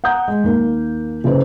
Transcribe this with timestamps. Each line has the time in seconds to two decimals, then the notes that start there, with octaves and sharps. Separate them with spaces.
0.04 F#5 A#5 D#6 G6
0.28 G#3
0.44 D#2 A#3
1.24 F#1 F#2 B4 C5